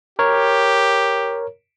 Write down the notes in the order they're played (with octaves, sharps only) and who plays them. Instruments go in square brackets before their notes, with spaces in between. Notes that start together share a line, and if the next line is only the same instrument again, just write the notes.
[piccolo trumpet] G4 [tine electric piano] A#4 C#5